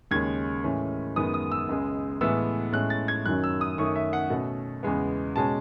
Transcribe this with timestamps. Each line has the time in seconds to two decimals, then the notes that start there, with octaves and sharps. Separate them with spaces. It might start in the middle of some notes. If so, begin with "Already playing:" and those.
0.11 D#2 C#3 G#3 C#4 G#6
0.64 A2 E3 G#3 C#4
1.16 F#2 D#3 G#3 B3 D#6
1.34 D#6
1.52 E6
1.69 C#2 C#3 G#3
2.21 A2 E3 G#3 B3 E6
2.73 A2 G#3 C#4 F#6
2.90 A6
3.08 G#6
3.25 F#2 D#3 F#3 C#4 F#6
3.44 E6
3.61 D#6
3.78 F#2 D#3 A3 C#4 C#6
3.96 E5
4.13 F#5
4.30 B2 A3 C#4
4.83 E2 C#3 G#3 B3
5.36 B2 G#3 C#4 A5